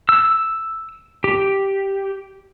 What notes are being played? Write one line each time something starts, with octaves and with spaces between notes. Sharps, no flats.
E6
G4